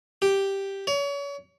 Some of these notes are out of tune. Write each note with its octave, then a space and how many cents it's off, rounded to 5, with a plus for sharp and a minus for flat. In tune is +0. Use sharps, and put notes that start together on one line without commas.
G4 +0
C#5 +35